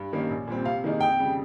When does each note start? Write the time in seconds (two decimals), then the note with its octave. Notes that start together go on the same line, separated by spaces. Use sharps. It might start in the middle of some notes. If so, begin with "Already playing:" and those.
Already playing: G2
0.13 D#3 G3 A#3 C#4
0.30 A#1
0.48 A#2 G3 C4
0.65 C3 F5
0.84 D#3 A#3 D#4 G#4
1.00 F2 G5
1.19 C#3 G3